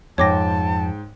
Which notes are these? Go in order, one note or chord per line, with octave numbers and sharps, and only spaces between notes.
F2 G#2 C#5 G5 A5 D6 A#6